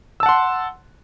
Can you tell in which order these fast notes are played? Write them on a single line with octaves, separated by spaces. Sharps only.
E6 A5 F#5 C6